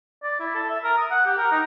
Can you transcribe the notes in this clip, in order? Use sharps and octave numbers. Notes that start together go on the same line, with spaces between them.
D5
E4
A4
E5
A#4
D#6
F#5
G4
A#4
D#4